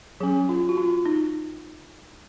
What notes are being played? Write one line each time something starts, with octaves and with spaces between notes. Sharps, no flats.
F#3 C#4 G#4
F4
F#4
F4
D#4